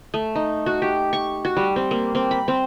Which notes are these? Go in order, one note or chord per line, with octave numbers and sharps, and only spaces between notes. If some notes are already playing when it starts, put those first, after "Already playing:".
A3
D#4
F#4
G4
C#6
F#4
G3
C4
A#3
C4
B5
C4